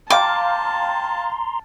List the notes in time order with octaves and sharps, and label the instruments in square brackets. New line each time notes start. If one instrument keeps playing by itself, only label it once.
[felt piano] F5 G5 [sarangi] A5 [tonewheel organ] A#5 C6 [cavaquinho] D6